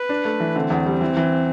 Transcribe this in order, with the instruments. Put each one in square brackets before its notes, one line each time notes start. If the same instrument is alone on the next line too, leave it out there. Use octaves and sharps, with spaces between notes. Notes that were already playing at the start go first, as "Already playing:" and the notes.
Already playing: [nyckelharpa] B4
[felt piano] D4
A3
E3
[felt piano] D3 [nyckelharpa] C4
[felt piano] E2
G3
E3
E3